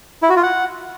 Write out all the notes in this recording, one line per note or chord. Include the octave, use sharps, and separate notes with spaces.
E4
F#4
F4
F#5